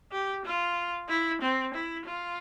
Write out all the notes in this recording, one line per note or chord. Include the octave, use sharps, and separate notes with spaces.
G4
F4
E4
C4
E4
F4